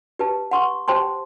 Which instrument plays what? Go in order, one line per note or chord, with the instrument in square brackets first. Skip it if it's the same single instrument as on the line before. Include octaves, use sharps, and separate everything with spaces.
[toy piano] G4 B4 A5
F#5 C6 C#6
G4 C5 G5 A5 C6